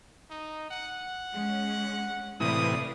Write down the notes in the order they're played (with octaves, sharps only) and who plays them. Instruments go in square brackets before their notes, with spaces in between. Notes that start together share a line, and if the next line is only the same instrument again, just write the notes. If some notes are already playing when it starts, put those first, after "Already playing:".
[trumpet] D#4
F#5
[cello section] G#3 C#4
[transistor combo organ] A2 C3 E3 [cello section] B4 D5 F5 [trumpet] D#6